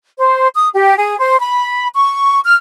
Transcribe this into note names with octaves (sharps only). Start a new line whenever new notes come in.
C5
D#6
G4
G#4
C5
B5
C#6
F6